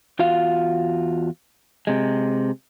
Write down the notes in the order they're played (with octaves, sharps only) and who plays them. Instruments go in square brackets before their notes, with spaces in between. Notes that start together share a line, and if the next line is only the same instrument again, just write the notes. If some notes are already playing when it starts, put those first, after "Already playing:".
[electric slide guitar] E2 F4 F#4 F5
C3 G#3